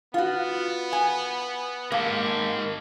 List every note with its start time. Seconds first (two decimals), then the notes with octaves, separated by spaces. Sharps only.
0.14 B3 F4 F#4
0.93 G#5
1.92 A#3 G4 A#4 D#5 A5